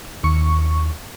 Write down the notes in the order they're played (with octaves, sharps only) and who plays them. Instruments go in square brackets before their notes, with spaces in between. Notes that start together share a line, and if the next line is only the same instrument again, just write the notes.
[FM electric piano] D#2 C#6